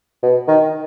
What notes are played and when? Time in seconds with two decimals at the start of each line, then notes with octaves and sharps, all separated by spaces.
0.23 B2
0.48 D#3